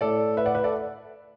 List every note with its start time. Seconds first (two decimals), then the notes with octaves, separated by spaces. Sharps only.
0.01 A2 A3 A4 D5
0.37 B4 E5
0.46 D5 F#5
0.55 B4 E5
0.64 A4 D5